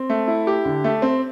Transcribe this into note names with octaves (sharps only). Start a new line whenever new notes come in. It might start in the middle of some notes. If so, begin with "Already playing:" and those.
Already playing: C4
A3
E4
G4
D3
A3
C4